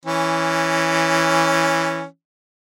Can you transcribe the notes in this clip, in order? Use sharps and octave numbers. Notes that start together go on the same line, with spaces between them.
E3 C#4